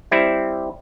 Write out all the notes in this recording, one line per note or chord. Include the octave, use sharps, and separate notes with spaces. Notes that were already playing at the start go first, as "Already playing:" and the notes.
G3 C4 E4